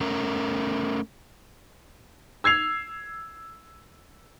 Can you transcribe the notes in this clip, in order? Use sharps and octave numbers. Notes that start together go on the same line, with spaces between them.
A3 C#4 A#4
E6 G#6 C7 F7